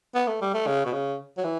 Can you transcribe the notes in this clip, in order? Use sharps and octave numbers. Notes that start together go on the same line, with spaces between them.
B3
A3
G3
A3
C#3
B2
C#3
F#3
E3